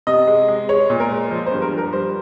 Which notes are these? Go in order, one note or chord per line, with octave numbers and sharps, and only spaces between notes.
C3 D#5
G#3
G#3
G#3 C#5
A#2
A#4
G#3
F3 C5
C5
G2
A#4
F3
A#4
G3 C5